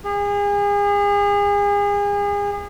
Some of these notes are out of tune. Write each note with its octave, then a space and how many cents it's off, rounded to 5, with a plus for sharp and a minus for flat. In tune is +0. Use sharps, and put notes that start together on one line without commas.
G#4 -35